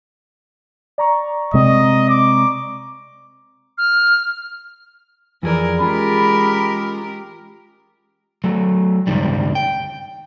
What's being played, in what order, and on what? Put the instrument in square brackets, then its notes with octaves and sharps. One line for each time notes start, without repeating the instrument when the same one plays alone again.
[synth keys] D5 A#5 C#6
[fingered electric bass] C3 G#3 C4 [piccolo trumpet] D#5
[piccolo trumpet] D6
[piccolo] F6
[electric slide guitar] F2 G#4 D5 [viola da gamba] E3 A#4
[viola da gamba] G#3 G4 A#4 [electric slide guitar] C#4 F4 G#4 [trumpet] B5
[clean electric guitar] F#3 A3
C#2 G2 D#3 G3
G5